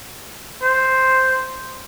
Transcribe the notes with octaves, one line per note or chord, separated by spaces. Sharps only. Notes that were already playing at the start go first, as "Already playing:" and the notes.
C5